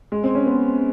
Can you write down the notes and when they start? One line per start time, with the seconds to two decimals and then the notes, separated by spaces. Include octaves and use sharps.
0.12 G#3
0.23 C4
0.35 C#4
0.46 B3